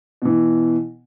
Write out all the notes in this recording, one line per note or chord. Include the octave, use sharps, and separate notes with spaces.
B2 E3